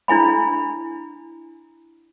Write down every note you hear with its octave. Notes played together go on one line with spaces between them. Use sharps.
D4 E4 G#5 B5